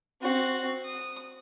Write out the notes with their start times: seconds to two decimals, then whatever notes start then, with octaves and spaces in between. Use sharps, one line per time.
0.21 C4 F#4
0.85 D#6